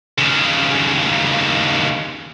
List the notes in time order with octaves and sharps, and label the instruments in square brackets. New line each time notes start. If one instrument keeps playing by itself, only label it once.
[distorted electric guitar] D#2 C#3